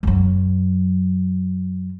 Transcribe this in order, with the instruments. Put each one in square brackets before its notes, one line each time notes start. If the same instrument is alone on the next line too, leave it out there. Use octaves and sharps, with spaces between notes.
[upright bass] F#2 F#3